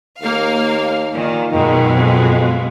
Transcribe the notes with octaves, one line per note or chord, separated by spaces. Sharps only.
D#2 A#3 F5
A#2 D#3
F#2 B2 D#3 G#3
F2